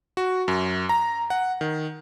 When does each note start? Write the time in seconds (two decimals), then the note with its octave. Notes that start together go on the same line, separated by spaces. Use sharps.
0.17 F#4
0.48 F#2
0.89 A#5
1.30 F#5
1.61 D#3